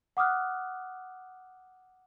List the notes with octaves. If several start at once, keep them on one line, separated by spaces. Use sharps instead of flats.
F#5 D6 D#6 F6 F#6